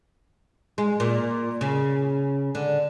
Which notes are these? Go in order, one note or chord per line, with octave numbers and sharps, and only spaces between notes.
G#3
A#2
C#3
D3